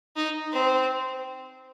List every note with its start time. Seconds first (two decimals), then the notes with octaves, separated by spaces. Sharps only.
0.16 D#4
0.52 C4